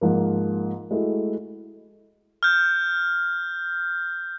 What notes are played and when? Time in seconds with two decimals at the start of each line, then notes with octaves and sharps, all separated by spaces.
0.01 G#2 F3 A#3
0.91 G#3 A3 E4 F#4
2.43 F6 G6